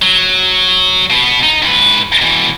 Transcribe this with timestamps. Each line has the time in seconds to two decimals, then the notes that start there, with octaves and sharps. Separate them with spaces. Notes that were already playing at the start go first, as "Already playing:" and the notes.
0.02 F#3
1.10 B2 B3
1.43 D#4
1.62 G#2 B4
2.21 B2 E3